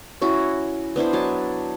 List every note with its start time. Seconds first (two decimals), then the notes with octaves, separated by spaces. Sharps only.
0.22 C#4 E4 F#4
0.96 B3 D4 E4 C5
1.13 F#3 G#5 A5